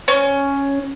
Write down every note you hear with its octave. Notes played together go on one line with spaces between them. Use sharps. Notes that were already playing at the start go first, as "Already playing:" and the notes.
C#4